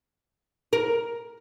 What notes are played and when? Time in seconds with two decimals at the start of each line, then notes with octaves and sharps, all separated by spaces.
0.73 A#4